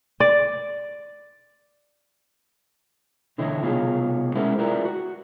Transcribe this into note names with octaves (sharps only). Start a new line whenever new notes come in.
D5
B2 D3 E3 E4 C#5 D#5
C2 B2 F4 G#4 C#5
G#3 C#4 E4 A#4 C5 F#5
E4 F4 G4 A#4 B4 D5
F#4